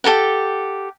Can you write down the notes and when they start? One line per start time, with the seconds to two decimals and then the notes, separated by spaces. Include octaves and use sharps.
0.04 G4 A4 A#4 F#5